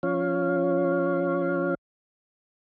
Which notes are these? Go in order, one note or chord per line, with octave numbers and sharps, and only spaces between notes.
F3 C#4 C#5 F5